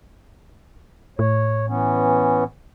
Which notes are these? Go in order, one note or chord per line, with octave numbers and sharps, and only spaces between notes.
A2 C#5
E3 B3 C#4